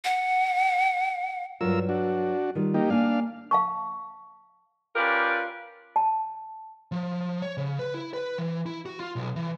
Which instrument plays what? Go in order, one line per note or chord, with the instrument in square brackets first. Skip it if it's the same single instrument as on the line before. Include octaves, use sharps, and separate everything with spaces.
[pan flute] F#5
[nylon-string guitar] G2 F#3 C#5 [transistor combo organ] F4 A#4 E6
[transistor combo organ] D4 F#4
[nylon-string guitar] D#3 G3 F4
[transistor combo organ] A#3 D#4 G4
[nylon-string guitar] A#3 G#5 [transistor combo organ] D4 F5
[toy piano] F5 A5 C#6
[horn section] C#4 F4 G4 A#4 B4 D5
[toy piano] A5
[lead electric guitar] F3
C#5
C#3
B4
E4
B4
E3
E4
F#4
F4
B1
E3